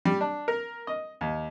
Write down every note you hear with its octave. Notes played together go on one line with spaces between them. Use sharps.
G3
D4
A#4
D#5
D#2